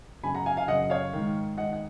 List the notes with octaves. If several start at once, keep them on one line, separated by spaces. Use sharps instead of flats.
F#2 C#3 G#5 B5
F#5 A#5
F5 G#5
F5 G#5
F#2 C#3 D#5 F#5
C#5 F5
G#2 D#3
G#2 D#3 D#5 F#5
F#5